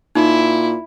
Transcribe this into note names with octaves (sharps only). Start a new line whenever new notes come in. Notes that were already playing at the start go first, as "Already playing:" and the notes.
A#2 D#4 E4